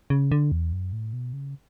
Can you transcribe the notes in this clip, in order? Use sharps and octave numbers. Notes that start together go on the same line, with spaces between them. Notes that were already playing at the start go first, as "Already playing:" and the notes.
C#3
D3
E2
F#2
A2
B2
C#3